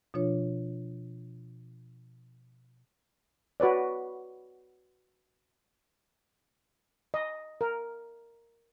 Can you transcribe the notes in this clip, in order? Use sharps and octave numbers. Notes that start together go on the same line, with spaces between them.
B2 F3 D4 F4 C#5
F#4 B4 C#5 D5
D#5
A#4